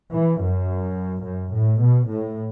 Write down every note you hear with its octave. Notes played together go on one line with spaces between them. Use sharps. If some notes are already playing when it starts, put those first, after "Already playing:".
E3
F#2
F#2
A2
B2
A2